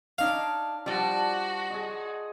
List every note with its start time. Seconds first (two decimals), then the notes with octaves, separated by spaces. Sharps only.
0.18 D4 D#4 C#5 F5
0.86 F3 G3 D4 F#4 D5
1.70 G#4 D#5